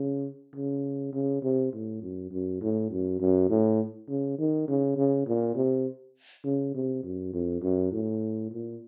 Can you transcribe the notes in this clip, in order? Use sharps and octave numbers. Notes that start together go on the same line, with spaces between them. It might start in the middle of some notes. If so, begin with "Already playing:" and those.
Already playing: C#3
C#3
C#3
C3
A2
F#2
F#2
A2
F#2
F#2
A2
C#3
D#3
C#3
C#3
A#2
C3
C#3
C3
F#2
F2
F#2
A2
A#2